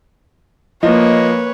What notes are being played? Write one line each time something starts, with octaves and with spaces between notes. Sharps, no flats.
F3 A#3 B4 C#5 D#5